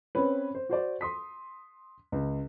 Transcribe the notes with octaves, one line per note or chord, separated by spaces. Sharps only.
C4 C#4 B4
C5
F#4 C5 D5
C6 D#6 B6
C#2